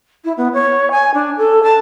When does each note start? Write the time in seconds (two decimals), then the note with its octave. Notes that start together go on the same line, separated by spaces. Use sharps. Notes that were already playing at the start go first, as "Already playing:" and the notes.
0.24 E4
0.37 B3
0.53 C#5
0.91 G#5
1.14 D4
1.38 A4
1.63 A5